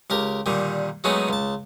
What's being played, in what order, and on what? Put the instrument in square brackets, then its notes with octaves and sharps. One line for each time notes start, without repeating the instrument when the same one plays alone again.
[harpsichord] C#2 G4 A#4
A#2 D3 D#3 G3
F#3 G#3 A3 B3 C#4 D#4
C#2 A5